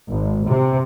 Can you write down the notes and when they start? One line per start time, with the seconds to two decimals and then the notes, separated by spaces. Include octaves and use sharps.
0.11 G#1
0.48 C3